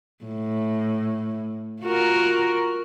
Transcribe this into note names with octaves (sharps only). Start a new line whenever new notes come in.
A2
F4 F#4 A#4